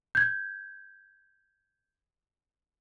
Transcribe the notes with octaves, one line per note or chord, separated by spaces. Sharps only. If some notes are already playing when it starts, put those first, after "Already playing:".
G6 G#6